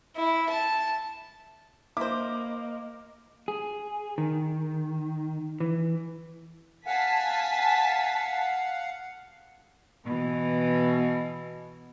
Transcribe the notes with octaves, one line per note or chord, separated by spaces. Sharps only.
E4
A5
A#3 E4 C5 D#5 D6
G#4
D#3
E3
F5 F#5 G#5 A5 B6
B2 E3